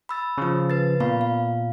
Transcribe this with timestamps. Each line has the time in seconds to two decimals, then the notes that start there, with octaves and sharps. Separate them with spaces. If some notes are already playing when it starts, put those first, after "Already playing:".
0.09 B5 E6 A6
0.38 C#3 F3
0.70 B4 A6
1.00 A#2 B3 F5 B5
1.21 F5